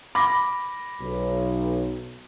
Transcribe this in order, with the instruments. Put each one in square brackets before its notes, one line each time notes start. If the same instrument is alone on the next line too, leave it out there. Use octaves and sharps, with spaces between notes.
[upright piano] B5 D6 A#6
[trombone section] B1